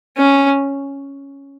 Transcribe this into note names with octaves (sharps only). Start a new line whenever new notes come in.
C#4